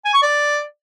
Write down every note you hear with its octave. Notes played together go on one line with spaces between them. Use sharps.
G#5
C#6
D5